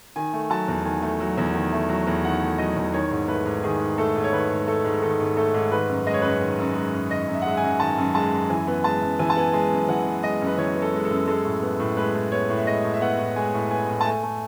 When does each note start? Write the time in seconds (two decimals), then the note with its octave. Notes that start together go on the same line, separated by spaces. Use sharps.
0.16 D#3 G#5
0.33 A3
0.50 F#3 A5
0.68 E2
0.85 D#3 G#5
1.02 A3
1.20 F#3
1.37 E2
1.55 D#3
1.73 A3
1.89 F#3
2.07 E2
2.24 D#3 F#5
2.41 A3
2.58 F#3 D#5
2.76 E2
2.94 D#3 C#5
3.11 G#2
3.28 A3 B4
3.46 G#2
3.64 D#3 G#4
3.80 G#2
3.98 A3 A4
4.15 G#2
4.24 C#5
4.33 D#3 B4
4.50 G#2
4.67 A3 A4
4.84 G#2
5.02 D#3 A4
5.19 G#2
5.37 A3 A4
5.54 G#2
5.71 D#3 B4
5.89 F#2
6.07 G#3 D#5
6.14 C#5
6.22 F#2 B4
6.30 C#5
6.41 D#3
6.59 F#2
6.75 G#3
6.93 F#2
7.11 D#3 D#5
7.28 F#2
7.34 E5
7.42 F#5
7.46 G#3 E5
7.57 G#5
7.63 F#2
7.80 D#3 A5
7.98 F#2
8.15 G#3 A5
8.32 F#2
8.50 E3 G#5
8.67 B3
8.84 G#3 A5
9.02 F#2
9.19 E3 G#5
9.30 A5
9.37 B3 G#5
9.53 G#3 G#5
9.71 F#2
9.88 E3 F#5
10.06 B3
10.23 G#3 D#5
10.41 F#2
10.47 B4
10.58 E3 C#5
10.75 B3
10.82 A4
10.94 G#3
11.05 A4
11.10 F#2
11.27 G#3 A4
11.45 A2
11.62 B3
11.80 A2
11.97 G#3 B4
12.14 A2
12.32 B3 C#5
12.50 A2
12.57 E5
12.67 G#3 D#5
12.84 A2
12.94 E5
13.01 B3 F#5
13.19 A2
13.36 G#3 G#5
13.54 A2
13.71 B3 G#5
13.88 A2
14.01 A5
14.06 A3 G#5
14.23 A3